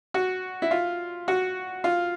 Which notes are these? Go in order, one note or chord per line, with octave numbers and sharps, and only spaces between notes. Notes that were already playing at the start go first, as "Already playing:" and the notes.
F#4
E4
F4
F#4
F4